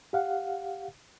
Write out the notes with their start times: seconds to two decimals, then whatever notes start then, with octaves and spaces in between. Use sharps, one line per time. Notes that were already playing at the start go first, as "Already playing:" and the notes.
0.13 G4 F5 F#5